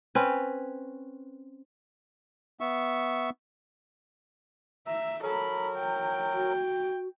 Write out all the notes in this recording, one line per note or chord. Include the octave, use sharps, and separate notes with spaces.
C4 C#4 B4
B3 E5 C#6
E5 A#5 E6
F#3 A4 A#4 B5
G5
F#4